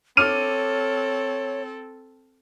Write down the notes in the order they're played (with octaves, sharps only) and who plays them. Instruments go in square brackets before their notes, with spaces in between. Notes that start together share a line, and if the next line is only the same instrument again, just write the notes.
[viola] C4 A4 [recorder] C#5 [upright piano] D6 F6 D#7